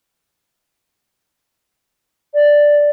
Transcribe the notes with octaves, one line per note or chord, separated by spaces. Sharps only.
D5